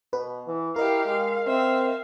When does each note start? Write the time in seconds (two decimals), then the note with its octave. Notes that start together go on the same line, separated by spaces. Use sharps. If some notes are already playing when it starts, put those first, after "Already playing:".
0.13 B2 B4
0.47 E3
0.76 E4 G4 A#4 D#5 F5
1.06 G#3 F5
1.47 C4 E5 F5